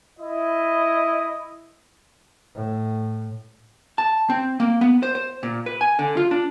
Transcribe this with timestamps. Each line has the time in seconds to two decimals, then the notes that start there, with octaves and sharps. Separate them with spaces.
0.19 E4 D#5
2.55 A2
3.98 A5
4.30 C4
4.60 A#3
4.81 B3
5.03 C5
5.15 C5
5.43 A#2
5.66 B4
5.81 G#5
5.99 D3
6.17 F4
6.31 D4